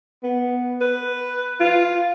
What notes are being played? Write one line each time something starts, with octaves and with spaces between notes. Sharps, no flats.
B3
B4
F4